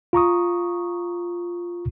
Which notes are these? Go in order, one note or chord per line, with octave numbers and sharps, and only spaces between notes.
F4 A#5 C#6 D#6